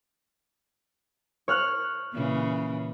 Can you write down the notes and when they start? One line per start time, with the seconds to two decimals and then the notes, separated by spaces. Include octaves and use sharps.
1.48 C#5 F6 F#6
2.13 A#2 C#3 E3